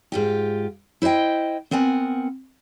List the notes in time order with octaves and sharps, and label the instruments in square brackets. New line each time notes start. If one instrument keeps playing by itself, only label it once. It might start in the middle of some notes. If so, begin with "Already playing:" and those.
[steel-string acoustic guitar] G#2 F4 G4
E4 C5 C#5 D#5 G5
B3 C4 A#4 F#5 G#5